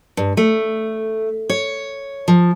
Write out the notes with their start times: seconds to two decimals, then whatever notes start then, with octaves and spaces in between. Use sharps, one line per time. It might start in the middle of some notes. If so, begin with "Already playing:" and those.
0.17 G2
0.37 A3
1.50 C#5
2.28 F3